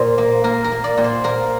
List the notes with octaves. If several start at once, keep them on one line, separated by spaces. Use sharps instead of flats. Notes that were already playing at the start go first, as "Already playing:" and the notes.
Already playing: A#2 C5
A#3
A#3 A#4
A#4
A#3
D5
A#2
C5
A#3 A#4